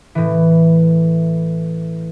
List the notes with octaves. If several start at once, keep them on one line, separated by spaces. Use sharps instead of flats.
A2 E3